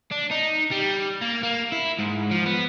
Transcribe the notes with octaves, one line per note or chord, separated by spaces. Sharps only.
D4
D#4
G3
A#3
A#3
E4
G#2
F3
B3